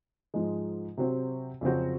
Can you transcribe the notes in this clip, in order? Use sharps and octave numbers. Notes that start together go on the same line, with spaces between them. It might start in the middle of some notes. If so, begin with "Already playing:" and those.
G#2 F3 G#3 D#4
C3 F#3 C4 F#4 C5
F2 C#3 F#3 C4 F#4